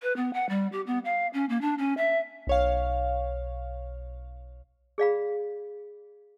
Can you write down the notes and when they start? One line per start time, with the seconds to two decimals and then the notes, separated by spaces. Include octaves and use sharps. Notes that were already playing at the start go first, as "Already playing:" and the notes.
0.02 B4
0.16 B3
0.34 F#5
0.49 G3
0.72 G4
0.87 B3
1.05 F5
1.33 C#4
1.49 A#3
1.61 D4
1.78 C#4
1.97 E5
2.47 B1 C#5 F5
4.98 G#4 D5 F5 B5